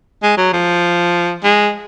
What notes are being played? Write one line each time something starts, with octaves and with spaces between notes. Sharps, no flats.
G#3
F#3
F3
G#3